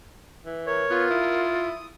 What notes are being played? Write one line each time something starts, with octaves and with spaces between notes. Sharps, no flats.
E3
A#4 C#5
B3 F4
E4 D#6